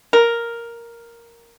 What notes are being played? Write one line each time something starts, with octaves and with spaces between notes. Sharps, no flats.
A#4